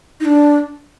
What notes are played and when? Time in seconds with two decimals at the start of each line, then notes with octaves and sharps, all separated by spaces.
0.20 D#4
0.25 D4